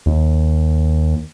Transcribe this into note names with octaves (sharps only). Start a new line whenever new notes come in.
D#2